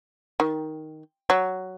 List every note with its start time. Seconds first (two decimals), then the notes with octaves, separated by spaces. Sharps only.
0.40 D#3
1.30 F#3